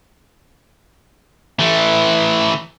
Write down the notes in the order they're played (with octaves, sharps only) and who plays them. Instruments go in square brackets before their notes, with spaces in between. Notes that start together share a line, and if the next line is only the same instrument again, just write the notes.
[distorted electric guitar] E3 A3